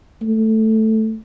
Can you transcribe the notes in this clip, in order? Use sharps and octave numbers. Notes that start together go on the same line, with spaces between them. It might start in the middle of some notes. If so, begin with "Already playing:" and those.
A3